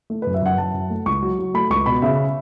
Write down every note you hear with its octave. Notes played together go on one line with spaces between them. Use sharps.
A3
F#2 B4
E5
F#2 F#5
F#2 A5
F#2
A3
C#2 C#6
F#3
F#3
A3 B5
C#2 C#6
B2 B5
C#3 E5